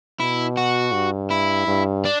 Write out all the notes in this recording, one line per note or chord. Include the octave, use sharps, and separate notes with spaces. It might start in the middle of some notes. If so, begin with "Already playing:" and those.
B2 E4
F#4
G2
E4
G2
D4